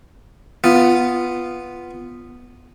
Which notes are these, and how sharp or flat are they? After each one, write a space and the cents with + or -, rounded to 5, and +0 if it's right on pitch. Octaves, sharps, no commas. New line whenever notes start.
B3 +0 F4 -10